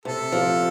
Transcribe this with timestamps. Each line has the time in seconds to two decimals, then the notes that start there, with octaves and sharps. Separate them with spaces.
0.05 C3 A4
0.32 F3